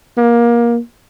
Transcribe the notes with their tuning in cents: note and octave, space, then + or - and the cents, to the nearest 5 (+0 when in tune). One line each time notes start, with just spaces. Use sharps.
A#3 +20